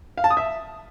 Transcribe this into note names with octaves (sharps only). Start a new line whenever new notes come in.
F5
A5
D#6
E5